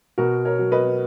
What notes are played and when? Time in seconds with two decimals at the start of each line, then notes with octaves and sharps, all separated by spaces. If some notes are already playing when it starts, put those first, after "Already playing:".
0.18 B2 F#4 A#4
0.45 A#4 C#5
0.59 F#3
0.72 B4 D#5